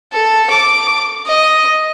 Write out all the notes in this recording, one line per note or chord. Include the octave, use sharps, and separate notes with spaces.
A4
D6
D#5